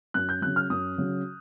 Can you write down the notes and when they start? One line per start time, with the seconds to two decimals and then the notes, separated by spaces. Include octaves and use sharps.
0.14 F#2 F#6
0.29 G6
0.42 C#3 F#3 F#6
0.56 F6
0.70 F#2 D#6
0.98 C#3 F#3